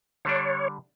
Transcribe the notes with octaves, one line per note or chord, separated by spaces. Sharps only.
D3 G3 D4 C#5